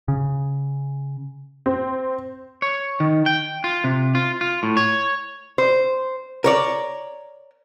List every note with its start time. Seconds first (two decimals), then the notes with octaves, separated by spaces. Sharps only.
0.08 C#3
1.66 C4
2.62 C#5
3.00 D#3
3.26 G5
3.64 F4
3.84 C3
4.15 F4
4.41 F4
4.63 A2
4.77 C#5
5.58 C5
6.44 A#4 C#5 D5